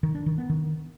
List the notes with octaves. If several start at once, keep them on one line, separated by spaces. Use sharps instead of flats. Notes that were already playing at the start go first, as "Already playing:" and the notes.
D#3
D4
D#3
B3
D#3